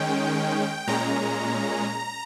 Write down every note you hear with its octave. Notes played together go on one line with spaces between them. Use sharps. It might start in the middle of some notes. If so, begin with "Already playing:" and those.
Already playing: D#3 G#3 C#4 G5
A#2 G#3 C#4 A#5